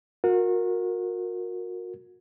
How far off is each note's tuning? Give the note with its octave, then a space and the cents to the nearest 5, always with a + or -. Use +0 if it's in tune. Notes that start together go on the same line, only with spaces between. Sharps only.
F#4 -35 A#4 -10